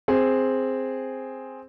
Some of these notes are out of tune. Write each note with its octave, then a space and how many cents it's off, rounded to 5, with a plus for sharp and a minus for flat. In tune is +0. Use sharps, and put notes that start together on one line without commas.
C4 +0 G#4 +0